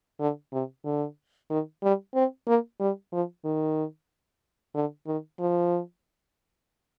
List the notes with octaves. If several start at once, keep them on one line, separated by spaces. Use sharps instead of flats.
D3
C3
D3
D#3
G3
C4
A#3
G3
F3
D#3
D3
D#3
F3